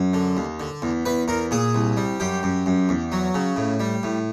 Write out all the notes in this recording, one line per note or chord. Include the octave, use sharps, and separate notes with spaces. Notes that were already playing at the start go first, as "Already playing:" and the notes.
Already playing: F#2
D3
D#2
D3
E2
E2 B4
E2 A#4
A#2 G#4
C2
G3
F#2 G4
F#2
F#2
E2
F#3
C#3
A2
G3
A2